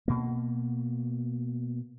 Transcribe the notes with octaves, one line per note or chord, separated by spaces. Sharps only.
B2 A#3